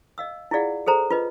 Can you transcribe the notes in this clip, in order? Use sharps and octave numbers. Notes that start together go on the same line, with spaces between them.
D#5 F5 E6
E4 F4 G#4 D5 F5 F#5
G#4 A4 C5 A#5
F4 B4 D#5